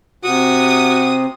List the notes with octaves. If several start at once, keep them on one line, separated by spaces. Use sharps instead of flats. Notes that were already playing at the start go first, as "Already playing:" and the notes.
C3 F#4 D#6